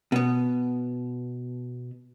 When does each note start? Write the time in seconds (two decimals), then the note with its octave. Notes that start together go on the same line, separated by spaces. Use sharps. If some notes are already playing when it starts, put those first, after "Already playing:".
0.12 B2 B3